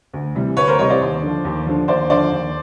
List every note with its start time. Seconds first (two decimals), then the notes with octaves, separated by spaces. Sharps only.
0.13 D2
0.35 C3 E3 G3
0.57 D2 B4 C#5
0.68 A#4 C5
0.79 C3 E3 G3 C#5 D#5
0.89 C5 D5
1.01 D#2
1.22 D3 F3
1.45 D#2
1.66 D3 F3
1.88 D#2 C5 D5
2.10 D3 F3 C5 D5
2.32 D#2